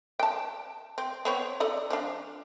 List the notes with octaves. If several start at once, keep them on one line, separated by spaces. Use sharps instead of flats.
G5 A5
C4
B3 C4 C#5
A4 D5 D#5
F3 D4